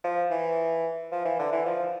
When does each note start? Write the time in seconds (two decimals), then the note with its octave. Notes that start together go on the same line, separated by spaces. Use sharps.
0.04 F3
0.31 E3
1.12 F3
1.25 E3
1.39 D3
1.52 E3
1.65 F3